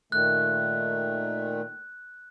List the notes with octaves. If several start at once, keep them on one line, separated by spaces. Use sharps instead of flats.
A#2 D#3 A3 F#6